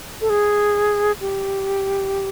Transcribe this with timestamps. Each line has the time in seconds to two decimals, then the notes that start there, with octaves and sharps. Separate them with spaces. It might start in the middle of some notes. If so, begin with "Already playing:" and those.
0.21 A4
0.30 G#4
1.21 G4